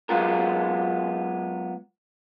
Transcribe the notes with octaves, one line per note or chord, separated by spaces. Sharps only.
F#3 G#3 B3 F4 A#4